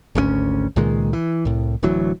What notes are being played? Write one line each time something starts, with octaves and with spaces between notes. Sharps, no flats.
G#1 D2 F3 C#4
C#2 A#2 D#3 G#3
E3
C2 A2
D1 D2 E3 F#3